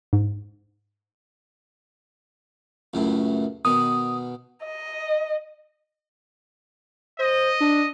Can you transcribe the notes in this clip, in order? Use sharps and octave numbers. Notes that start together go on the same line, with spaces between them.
G#2
C#2 F#2 A2
B2 D#3 D#6
D#5
C5 D#5
D4